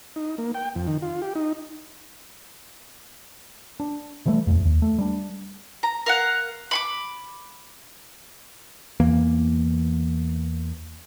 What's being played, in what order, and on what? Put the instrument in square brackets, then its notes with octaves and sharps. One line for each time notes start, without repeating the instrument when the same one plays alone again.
[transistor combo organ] D#4
A#3
G5
F2
D#3
F4
G4
D#4
[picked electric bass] D4
B2 E3 G3 A3
D#1 F2
D#2
A3
G3 D4
[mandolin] A#5
A#4 F5 F#5
B5 C#6 D6
[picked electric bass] E2 E3 A#3